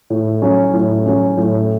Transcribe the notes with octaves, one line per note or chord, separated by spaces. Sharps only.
A2
F#3 C#4
A2
F#3 C#4
A2